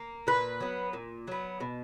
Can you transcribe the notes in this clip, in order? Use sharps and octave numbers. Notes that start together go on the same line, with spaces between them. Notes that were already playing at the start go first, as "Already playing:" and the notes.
Already playing: A#3
A#2 B4
F#3 B3
A#2
F#3 B3
B2